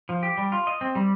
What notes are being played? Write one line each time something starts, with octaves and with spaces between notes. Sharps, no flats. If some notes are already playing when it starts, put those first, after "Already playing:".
F3
G4
G3
F4
D#5
C4
G3